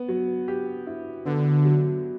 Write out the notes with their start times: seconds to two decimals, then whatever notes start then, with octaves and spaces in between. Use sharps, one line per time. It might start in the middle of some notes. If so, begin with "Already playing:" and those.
Already playing: B3
0.08 F#3
0.48 G4
0.87 E4
1.25 D3 B3
1.65 F#3